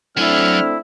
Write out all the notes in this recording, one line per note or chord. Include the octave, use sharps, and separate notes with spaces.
F#3 A3 C4 D4 E4 G#5 F6